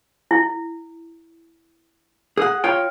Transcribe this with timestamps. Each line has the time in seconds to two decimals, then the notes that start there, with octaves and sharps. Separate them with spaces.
0.31 E4
2.37 G#4 F#5
2.64 F4 C#5 G5